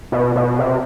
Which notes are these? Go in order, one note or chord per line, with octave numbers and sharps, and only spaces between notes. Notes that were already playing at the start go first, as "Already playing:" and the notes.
B2
B2
C3